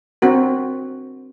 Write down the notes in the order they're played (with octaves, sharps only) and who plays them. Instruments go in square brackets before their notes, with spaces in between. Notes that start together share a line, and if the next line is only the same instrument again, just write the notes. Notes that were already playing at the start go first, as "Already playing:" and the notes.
[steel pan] C4 D4 F#4 A#4